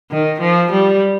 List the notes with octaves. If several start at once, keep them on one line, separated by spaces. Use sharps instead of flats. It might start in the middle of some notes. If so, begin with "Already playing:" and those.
D#3
F3
G3